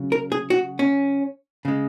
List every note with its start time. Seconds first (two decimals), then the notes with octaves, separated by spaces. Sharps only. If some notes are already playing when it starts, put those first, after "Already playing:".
Already playing: C#3 F#3
0.12 A#4
0.32 G#4
0.50 F#4
0.79 C#4
1.65 C#3 G#3